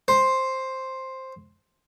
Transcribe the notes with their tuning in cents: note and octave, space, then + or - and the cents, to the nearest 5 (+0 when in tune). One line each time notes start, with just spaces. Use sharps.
C5 +5